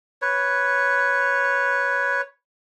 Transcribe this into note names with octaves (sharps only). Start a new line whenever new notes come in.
B4 C#5